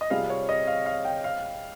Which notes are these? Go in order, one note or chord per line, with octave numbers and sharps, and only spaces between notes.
D#5
C3 G3 C4 F4 G#4 F5
C#5
D#5
F5
F5
G5
F5